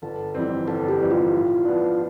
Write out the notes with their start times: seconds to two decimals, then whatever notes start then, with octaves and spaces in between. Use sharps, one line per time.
0.02 G1 A4
0.35 F2 E3 G3 C4
0.67 G1 A4
0.89 G4
1.00 F2 E3 G3 C4
1.11 F4
1.33 A2
1.65 F3 B3 D4